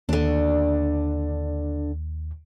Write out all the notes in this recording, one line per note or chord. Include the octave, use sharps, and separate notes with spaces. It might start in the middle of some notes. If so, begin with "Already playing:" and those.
D#2 D3 D4